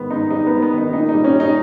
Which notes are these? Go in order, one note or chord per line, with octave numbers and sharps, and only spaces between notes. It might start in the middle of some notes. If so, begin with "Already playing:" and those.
Already playing: G#2 D#3 B3
G#2 D#4
G3 D#4
B3
G#2
B3
D#3
D#4
A#2 D#4
D#4
G3
C#4
G3
D#4